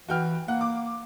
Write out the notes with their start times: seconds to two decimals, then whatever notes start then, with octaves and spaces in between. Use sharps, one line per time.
0.09 E3 F#4 G5 F6
0.48 A#3 F#5
0.61 D6